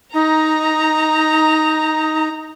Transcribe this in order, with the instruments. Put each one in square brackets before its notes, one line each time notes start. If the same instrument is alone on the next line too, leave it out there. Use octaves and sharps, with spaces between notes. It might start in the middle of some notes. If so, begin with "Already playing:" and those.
[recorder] D#4 [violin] A#5